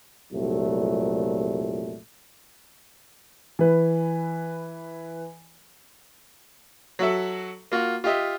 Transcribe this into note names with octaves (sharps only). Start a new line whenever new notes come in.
C2 F2 A#2 F#3 G3 A3
E3 B4
F#3 F#4 A4 E5
A#3 F4 F#4
F4 G4 D#5 E5